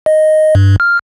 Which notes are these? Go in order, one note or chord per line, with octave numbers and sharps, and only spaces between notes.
D#5
G2
F6